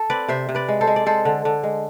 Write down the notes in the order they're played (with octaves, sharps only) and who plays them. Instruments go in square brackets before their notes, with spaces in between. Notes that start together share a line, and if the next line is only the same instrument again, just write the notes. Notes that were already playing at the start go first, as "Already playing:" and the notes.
Already playing: [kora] A4
C4 B4 D5
C3 C5 E5
C3
B4 D5
G#3
A4 C5
G#3
D5
G#3 A4 C5
D3
D3
G#3